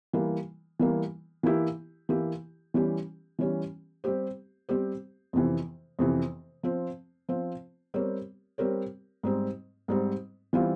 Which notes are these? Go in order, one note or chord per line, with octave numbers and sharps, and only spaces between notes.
E3 G3 A#3
E3 G3 A#3
E3 A#3 E4 G4
E3 A#3 E4 G4
E3 G3 C#4 G4
E3 G3 C#4 G4
G3 C4 G4 C5
G3 C4 G4 C5
F2 C3 E3
F2 C3 E3
F3 C4 F4 C5
F3 C4 F4 C5
G3 C4 G4 A#4 C#5
G3 C4 G4 A#4 C#5
G#2 G3 C4
G#2 G3 C4
E3 G3 C4 F4